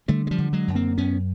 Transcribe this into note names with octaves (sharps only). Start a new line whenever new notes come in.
D3 G3 A3
G#3
F3 G3
D3
F#3 G#3
F#2
A#3 C4
F#2 B3 C#4